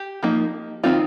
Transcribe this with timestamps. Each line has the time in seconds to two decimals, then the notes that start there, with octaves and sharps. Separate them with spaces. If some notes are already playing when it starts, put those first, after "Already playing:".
Already playing: G4
0.23 F3 A#3 D#4
0.84 D#3 G3 C4 D#4 F4